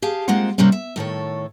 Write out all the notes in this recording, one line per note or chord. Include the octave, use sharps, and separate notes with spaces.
G4 G#4 F5 A5
G#3 A#3 C4 F4 F#5
C3 G3 A#3 C4 C#4
E5
A2 D#3 A4 C#5